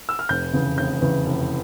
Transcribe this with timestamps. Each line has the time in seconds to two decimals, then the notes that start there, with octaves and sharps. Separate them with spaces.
0.09 E6
0.19 F6
0.29 F1 G6
0.53 E2 C#3 E3
0.78 F1 G6
1.01 E2 C#3 E3
1.26 F1